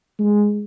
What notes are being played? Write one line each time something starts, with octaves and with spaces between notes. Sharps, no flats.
G#3